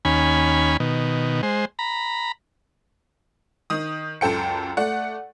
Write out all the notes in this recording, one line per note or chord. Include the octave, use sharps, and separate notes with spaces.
D#2 C#4 G#5 B5
B2 D#3
G#3 C5
A#5 B5
D#3 D#6
C#2 F#2 A4 G5 C#7
A3 D5 F#5